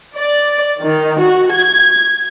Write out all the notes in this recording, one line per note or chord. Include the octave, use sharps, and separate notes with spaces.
D5
D#3
F#4
G#6